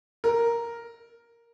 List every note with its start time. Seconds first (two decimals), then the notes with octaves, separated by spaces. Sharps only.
0.24 A#4